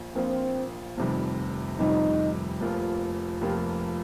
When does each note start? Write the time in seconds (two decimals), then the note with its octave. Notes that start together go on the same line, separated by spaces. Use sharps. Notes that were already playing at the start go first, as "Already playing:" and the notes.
Already playing: A#1 F4
0.15 A#1 A#2 A#3 C4 F4
0.97 F1 F2 C3 D#3 G3
1.78 F1 F2 C3 D#3 G3 D#4
2.60 F1 F2 F3 A#3 F4
3.41 F1 F2 F3 A#3 F4 G4